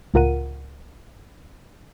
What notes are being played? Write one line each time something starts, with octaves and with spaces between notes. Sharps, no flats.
C#2 A2 F4 A#4 F#5 D#7